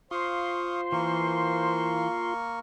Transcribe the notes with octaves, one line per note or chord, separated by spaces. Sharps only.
F4 C5 F5 C6 C#6 D#6
E3 A#3 A#4 C#6